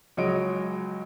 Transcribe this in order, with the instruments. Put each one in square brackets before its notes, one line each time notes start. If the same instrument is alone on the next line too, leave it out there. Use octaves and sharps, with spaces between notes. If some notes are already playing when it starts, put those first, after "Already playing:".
[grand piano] C#2 F#3 G#3 C#5 D#5 D7